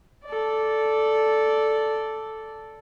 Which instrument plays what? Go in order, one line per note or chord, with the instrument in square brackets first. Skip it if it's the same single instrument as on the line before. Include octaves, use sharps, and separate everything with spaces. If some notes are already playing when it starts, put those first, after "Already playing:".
[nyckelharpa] A4 D5